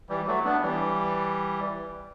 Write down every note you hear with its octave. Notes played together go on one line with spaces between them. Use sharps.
E3 G3
F#3 A3
B3 D4
E3 G3